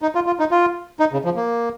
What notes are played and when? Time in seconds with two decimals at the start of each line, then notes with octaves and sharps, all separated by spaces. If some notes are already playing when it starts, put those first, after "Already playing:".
0.02 D#4
0.15 F4
0.27 F4
0.39 D#4
0.51 F4
1.00 D#4
1.13 C#3
1.25 F3
1.36 A#3